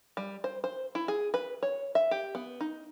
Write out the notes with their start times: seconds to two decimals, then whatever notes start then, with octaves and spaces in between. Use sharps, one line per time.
0.17 G3
0.44 C5
0.64 C5
0.95 E4
1.08 G#4
1.34 B4
1.63 C#5
1.95 E5
2.11 G4
2.35 B3
2.61 D#4